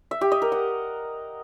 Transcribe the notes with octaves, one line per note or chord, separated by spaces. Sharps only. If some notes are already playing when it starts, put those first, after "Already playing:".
E5
G4
D#5
A#4
F#5